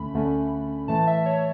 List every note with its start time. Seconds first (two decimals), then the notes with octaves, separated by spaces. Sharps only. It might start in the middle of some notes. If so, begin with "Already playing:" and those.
Already playing: D2 D3 A3 C#4 B5
0.14 D2 D3 A3 C#4
0.88 A2 E3 A3 A5
1.07 E5
1.26 C#5